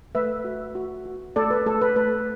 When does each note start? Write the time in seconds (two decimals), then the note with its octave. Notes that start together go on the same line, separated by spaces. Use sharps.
0.15 A3 B4 E5
0.45 F#4
0.75 F#4
1.06 F#4
1.36 A3 A4 D5
1.51 B4
1.66 A3 A4
1.81 B4
1.96 A3 B4